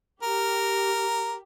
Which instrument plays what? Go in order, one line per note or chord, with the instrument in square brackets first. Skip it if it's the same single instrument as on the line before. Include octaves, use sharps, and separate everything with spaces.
[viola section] G4 [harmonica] A#4